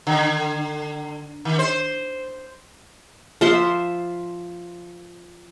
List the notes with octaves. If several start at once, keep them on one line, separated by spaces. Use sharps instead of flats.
D3
D#3
C5
F3 C5 E5 C6